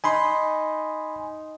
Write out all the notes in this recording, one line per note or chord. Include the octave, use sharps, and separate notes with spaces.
D#4 G#5 B5 C6